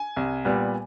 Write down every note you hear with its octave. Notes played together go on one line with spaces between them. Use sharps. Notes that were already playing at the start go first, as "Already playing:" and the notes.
Already playing: G#5
C2
A#2 G3 B3